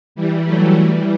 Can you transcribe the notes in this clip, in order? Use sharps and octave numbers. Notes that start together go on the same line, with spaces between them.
E3 G3
F#3 A3
E3 G3